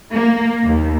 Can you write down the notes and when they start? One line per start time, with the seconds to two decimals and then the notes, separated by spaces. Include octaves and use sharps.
0.13 A#3
0.65 D#2